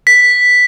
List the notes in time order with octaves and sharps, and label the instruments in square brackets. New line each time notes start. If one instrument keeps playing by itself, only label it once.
[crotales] B6